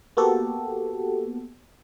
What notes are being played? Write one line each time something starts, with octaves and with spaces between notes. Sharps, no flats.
A#3 B3 F#4 G4 A4